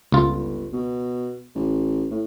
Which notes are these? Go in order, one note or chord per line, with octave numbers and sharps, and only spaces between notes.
G1 C#2 F4
B2
A1
A2